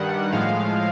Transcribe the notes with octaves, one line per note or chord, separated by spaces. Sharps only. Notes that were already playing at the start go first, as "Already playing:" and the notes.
Already playing: G2 D#3 G3 F#5
A2 F3 G#3 F5